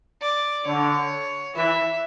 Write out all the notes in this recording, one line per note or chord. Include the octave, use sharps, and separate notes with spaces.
D5
D3 C#5
E3 E5